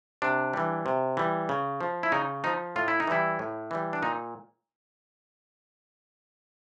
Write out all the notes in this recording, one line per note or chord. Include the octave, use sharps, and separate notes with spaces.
C3 D4
E3 G3
C3
E3 G3
C#3
F3
E4
C#3 D#4
F3 D#4
A2 F4
E4
D#4
E3 G3 E4
A2
E3 G3
D4
A#2 D#4